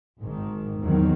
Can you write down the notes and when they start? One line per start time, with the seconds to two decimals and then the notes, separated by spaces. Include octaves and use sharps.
0.22 G#1 G#2 D#3
0.80 E2 D#3 F#3 C4